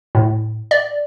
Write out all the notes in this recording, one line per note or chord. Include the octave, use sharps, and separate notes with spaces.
A2
D5